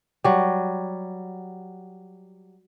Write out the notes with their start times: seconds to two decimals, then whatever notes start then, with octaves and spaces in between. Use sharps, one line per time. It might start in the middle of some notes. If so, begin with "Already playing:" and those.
0.24 F#3 G3